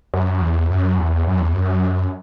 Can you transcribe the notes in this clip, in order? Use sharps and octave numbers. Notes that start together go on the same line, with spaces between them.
F#2
E2
F#2
E2
F#2
E2
F#2